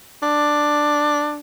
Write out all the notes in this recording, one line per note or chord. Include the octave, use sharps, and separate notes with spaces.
D4